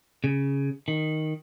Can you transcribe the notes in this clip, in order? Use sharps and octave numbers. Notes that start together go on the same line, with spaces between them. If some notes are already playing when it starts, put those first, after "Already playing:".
C#3
D#3